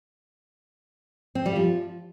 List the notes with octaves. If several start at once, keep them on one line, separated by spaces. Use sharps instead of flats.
C4
G3
F3